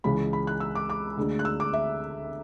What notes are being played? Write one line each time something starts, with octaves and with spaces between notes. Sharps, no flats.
C#2 C#3 E3 G#3 B5
B5
F#6
E6
D6
D6
D2 D3 G#3
F#6
E6
D6
E5